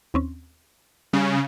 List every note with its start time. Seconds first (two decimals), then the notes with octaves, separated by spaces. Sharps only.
0.14 D#2 C4 C#4
1.13 C#3 G3